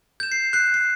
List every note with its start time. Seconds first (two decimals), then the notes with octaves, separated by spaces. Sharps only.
0.20 G6 E7
0.32 C7
0.53 F#6 C7
0.74 C7